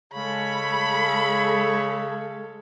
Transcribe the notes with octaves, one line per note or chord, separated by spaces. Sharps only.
C#3 G#3 A4 C#5 B5